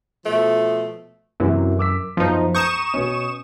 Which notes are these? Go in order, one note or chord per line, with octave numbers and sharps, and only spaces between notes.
B2 F3 A3
F#2 C3 E3 F#3
D6 E6 B6
F#2 F3 B3 D#4 C5
A#5 C#6 D#6 G6 E7
B2 C#4